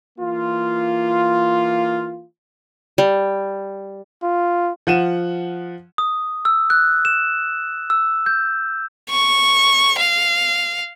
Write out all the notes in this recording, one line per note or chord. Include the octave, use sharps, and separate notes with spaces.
E3 A#3 F4
G3
F4
F3 F#5 D#7 E7
D#6
E6
F#6
E7
E6
G6
C#6
F5